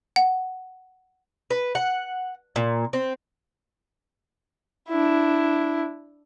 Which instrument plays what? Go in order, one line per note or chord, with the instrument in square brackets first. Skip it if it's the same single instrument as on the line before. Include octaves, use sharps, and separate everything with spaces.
[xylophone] F#5
[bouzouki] B4
F#5
A#2
C4
[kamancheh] D4 E4